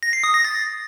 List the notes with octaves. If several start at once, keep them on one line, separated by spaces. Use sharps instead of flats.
A#6
C7
D#6
A#6
A6